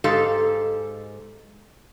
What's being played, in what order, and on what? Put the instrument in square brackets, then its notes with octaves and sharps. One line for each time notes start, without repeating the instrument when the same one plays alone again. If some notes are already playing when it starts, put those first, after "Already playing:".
[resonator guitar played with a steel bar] G#2 G#3 G4 A4 F5